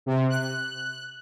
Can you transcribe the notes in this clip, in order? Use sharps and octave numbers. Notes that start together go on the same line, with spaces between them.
C3
F#6